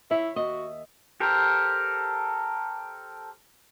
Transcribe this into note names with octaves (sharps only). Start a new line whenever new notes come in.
E4 C#5 E5
D#2 F#4 D#5
G4 A4 A#4 C5